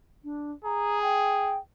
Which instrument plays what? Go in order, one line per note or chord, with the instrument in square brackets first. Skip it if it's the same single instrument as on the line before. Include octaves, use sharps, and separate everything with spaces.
[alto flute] D4
[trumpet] G#4 [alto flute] A#5
[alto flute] G5